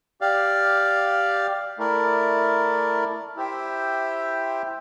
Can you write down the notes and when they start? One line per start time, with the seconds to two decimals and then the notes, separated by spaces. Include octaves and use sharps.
0.21 G4 D5 F5
1.78 A3 E4 A#4 D5
3.36 E4 G4 C5 E5 G5